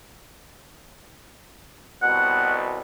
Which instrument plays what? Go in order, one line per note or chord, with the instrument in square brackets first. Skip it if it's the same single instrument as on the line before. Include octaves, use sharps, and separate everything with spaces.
[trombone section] C2 B2 [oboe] F#5